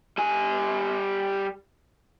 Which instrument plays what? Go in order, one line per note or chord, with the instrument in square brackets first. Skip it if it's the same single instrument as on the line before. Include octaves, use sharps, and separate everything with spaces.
[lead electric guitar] G3 G#5